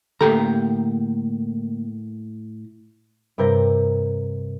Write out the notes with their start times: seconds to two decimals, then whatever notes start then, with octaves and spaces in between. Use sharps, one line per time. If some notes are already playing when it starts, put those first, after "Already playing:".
0.21 A2 D3 A#3 G4 A4 A#5
3.38 G2 C3 A#4 G6 A#6